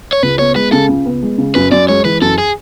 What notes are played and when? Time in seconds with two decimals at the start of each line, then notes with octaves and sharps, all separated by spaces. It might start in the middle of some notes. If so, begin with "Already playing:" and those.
0.13 C#5
0.23 C#2 B4
0.39 B3 C#5
0.55 G#3 B4
0.72 C#3 A4
0.89 C#2
1.06 B3
1.22 G#3
1.38 C#3
1.55 F#2 B4
1.71 F#2 D5
1.89 G#3 C#5
2.05 E3 B4
2.21 F#2 A4
2.38 G#4